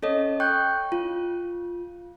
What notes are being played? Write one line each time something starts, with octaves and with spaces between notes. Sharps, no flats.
C#4 A4 C#5 D#5
G5 C#6 F#6 G6
F4